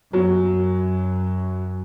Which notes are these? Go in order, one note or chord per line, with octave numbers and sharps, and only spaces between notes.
F#2 F#3